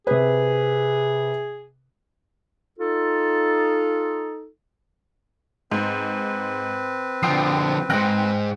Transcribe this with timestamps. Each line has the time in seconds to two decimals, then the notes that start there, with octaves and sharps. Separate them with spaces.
0.07 C3 G#4 B4
2.79 D#4 F4 A4
5.71 G#2 C4 B4
7.23 D3 F3 G5 D#6 C7
7.90 F2 G#2 G5 F#6 A#6